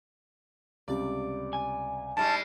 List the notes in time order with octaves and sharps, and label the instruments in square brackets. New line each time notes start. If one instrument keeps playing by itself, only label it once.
[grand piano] C#2 C3 G3 [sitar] D5
[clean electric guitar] G#5
[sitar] G#2 G3 G#3 [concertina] A5